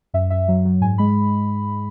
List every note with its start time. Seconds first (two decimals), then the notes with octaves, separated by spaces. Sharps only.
0.14 F#2 E5
0.30 F#2 E5
0.48 F#3
0.65 F#3
0.81 G#2 G#5
0.98 G#3 B5